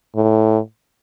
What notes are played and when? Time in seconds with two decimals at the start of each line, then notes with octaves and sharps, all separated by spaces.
0.16 A2